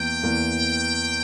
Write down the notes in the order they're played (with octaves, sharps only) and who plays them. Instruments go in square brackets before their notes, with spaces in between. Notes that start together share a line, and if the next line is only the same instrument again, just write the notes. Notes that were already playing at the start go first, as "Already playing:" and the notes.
Already playing: [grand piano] E2 E3 A#3 [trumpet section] G5
[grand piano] E2 E3 A#3